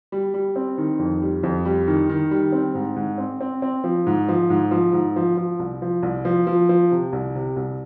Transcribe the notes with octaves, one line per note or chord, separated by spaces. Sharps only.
G3
G3
C4
D#3
F2
G3
F2
G3
D#3
D#3
G3
C4
G#2
G#2
C4
C4
C4
F3
G#2
F3
G#2
F3
G#2
F3
F3
C2
F3
C2
F3
F3
F3
C3
C2
C3
C2